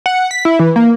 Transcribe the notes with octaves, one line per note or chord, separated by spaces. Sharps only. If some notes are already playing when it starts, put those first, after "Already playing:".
F#5
B6
E4
E3
A#3